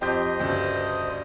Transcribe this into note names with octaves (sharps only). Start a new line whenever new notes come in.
F2 G4 C5 D#5 G6
D2 G2 C#3